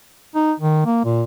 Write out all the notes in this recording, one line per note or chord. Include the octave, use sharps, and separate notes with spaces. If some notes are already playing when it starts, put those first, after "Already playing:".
D#4
D#3
A#3
A#2